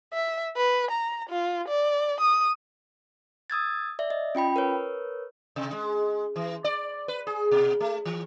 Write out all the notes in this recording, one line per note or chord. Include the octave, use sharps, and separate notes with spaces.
E5
B4
A#5
F4
D5
D#6
D#6 E6 G#6 A6
D5 E5
D#5
C#4 F4 G5 B5
A#4 B4 C#5
C3
G#3
E3
D5
B4
G#4
B2
A3
E3